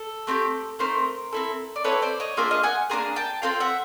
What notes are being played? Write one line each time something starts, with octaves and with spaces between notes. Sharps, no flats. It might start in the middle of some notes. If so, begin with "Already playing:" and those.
Already playing: A4
A3 C4 D#4 G4
A3 C4 D#4 A#4 C5
C4 E4 A4
D5
C4 E4 A4 B4 C#5
C5 D5
C#5 D#5
A#3 D4 F4 G#4 D5 E5
D#5 F5
F#5 G#5
A#3 D4 F4 G#4 G#5 A#5
G5 A5
C4 F4 A4 F5 G5
E5 F#5